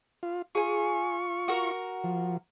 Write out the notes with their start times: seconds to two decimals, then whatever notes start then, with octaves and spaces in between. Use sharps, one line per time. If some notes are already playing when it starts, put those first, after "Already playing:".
0.23 F4
0.55 F4 G#4 G#5 C#6
1.48 F#4 A#4
2.04 F3